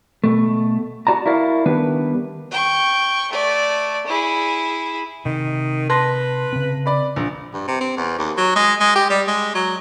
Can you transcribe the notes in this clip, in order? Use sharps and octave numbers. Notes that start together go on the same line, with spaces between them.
B2 A3
F#4 D5 A5 A#5
E4 F#4 A#4 D5 F5
D#3 G3 B3 D4 B4
G5 C#6
A3 D5
E4 G#4
C3 D#3
B4 A5 C6 A#6
C#3 C4
D5 B5
A#1
G2
C3
C4
E2
D#2
F#3
G#3
G#3
G4
G3
G#3
F#3